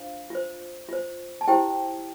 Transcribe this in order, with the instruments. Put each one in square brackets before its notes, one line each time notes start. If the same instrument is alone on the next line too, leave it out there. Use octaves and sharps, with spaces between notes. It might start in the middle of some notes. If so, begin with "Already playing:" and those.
Already playing: [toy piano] D4 F4 C5 F5
F4 C5
F4 C5
A5
E4 G4 C5 G5